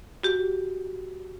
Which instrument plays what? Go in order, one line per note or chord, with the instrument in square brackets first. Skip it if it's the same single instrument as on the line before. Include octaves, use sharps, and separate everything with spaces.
[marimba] F#4 G4